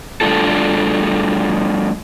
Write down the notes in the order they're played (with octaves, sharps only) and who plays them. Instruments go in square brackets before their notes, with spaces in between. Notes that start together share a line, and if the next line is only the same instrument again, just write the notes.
[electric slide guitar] G3 A3 D4 F4 A4